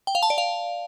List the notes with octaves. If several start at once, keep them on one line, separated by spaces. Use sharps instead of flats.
G5
F5
A5
D5
F5